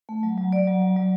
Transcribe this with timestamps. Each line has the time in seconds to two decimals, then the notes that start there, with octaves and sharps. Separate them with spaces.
0.09 A3
0.23 F#3
0.38 F#3
0.52 F#3 D5
0.67 F#3
0.82 F#3
0.97 F#3